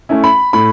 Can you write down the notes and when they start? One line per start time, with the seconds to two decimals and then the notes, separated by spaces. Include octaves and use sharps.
0.09 A3 C#4 E4
0.24 B5
0.53 A2 B5